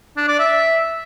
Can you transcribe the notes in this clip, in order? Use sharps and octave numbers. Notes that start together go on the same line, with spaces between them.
D4
D5
E5